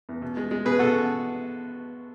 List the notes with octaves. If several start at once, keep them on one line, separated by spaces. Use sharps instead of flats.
E2
B2
G#3
G#3
B2 G#4 B4
B2 F#4 A4